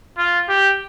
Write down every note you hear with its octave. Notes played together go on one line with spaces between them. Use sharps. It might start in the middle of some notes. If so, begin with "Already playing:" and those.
F4
G4